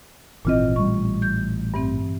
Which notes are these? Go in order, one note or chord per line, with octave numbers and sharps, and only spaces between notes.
G#1 A#2 E3 C4 F4 D#5
A1 G3 C#6
G6
G2 E3 C4